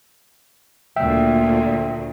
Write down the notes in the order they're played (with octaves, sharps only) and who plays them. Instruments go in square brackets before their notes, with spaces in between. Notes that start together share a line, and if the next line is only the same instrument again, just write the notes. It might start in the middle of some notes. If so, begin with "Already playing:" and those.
[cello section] D2 A#2 [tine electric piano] E5 G5